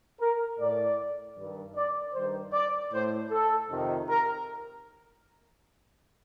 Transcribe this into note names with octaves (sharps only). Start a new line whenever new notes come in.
A#4
A2 D5
G2 D#3
D5
G2 D#3 C5
D5
A2 C5
A4
F2 C3 D#3
A#4